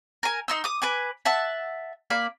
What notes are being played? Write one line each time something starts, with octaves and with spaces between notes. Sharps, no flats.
A#4 G#5
D#4 C6 E6
D6 D#6
B4 G#5 D6
E5 F#5 A5 E6
A#3 D5 B5